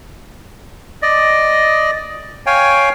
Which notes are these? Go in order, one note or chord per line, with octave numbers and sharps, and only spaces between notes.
D5 D#5
C#5 F5 G5 G#5